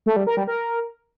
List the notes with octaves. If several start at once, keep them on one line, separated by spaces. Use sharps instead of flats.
A3
G3
A#4
G3
A#4